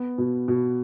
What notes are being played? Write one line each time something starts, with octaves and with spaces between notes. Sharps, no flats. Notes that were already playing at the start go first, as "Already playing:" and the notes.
Already playing: B3
B2
B2